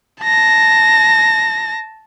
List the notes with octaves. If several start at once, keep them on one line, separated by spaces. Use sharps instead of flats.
A5 A#6